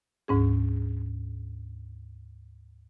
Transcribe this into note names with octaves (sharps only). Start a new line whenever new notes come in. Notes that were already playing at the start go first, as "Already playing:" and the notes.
D2 G#2 C#4 G#4